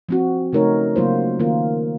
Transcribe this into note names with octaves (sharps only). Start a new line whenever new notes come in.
F3 C4 F#4
C#3 A3 D#4 A#4 C#5
C#3 F#3 A#3 F4 C5
D#3 F#3 A#3 F4 A#4